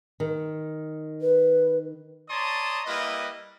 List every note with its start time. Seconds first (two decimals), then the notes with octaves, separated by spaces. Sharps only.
0.20 D#3
1.21 B4
2.29 C#5 D5 A5 A#5 C6 D#6
2.85 G3 A#3 E4 B4 D#5